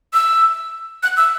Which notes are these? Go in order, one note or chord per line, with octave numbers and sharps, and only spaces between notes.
E6
F#6
E6